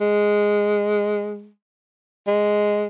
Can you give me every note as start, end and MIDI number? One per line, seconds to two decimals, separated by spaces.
0.01 1.51 56
2.27 2.87 56